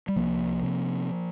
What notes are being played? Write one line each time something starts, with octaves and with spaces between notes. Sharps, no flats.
G3
C2 F3 A#3
C3